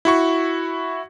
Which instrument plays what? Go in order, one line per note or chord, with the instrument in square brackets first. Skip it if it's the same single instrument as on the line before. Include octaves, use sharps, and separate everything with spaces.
[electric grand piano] E4 F#4 C#6